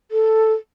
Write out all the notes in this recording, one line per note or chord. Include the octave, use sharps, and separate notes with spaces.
A4